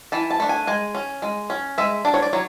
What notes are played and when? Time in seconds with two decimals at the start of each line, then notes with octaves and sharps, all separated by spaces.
0.12 E3 A5
0.31 A5
0.40 A3 D4
0.49 G#5
0.67 G#3 G#5
0.95 C#4
1.22 G#3
1.50 C#4
1.78 G#3 E5
2.05 D4 D5
2.14 C#5
2.22 D5
2.33 F#3 C#5